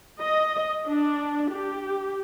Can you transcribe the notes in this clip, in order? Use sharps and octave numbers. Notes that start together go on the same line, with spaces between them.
D#5
D4
G4